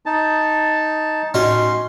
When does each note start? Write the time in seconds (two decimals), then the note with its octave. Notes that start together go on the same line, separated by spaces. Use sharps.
0.06 D#4 A5
1.34 A2 C#4 D#4 F#4 D#5 C6